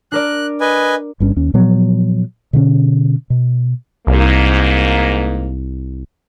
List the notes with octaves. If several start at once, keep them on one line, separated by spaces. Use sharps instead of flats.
D4 A#4 D5 F#6
B4 D#5 G#5
G1 G2 C#4
D#2 C#4
A#2 F3 F#3 B3
B2 D3 C4 C#4
B2
C2 G#2 A#3